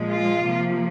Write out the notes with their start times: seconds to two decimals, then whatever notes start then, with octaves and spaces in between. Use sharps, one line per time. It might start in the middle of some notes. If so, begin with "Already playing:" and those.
Already playing: A#2 F3 G#3
0.09 F4
0.43 C3 F3 A#3